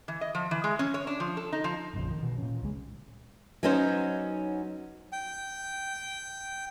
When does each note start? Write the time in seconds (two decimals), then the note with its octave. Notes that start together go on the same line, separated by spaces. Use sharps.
0.08 E3
0.21 D#5
0.35 F3
0.51 E3
0.64 G#3
0.79 C#4
0.94 C#5
1.07 D4
1.20 F3
1.37 A4
1.52 D#4
1.64 F3
1.93 F1 A#1 F2 C#3
2.11 D#3
2.23 B2 E3
2.38 A#2 C#4
2.61 D1 C#2 G#3
3.63 F#3 B3 C#4 D#4 C5
5.12 G5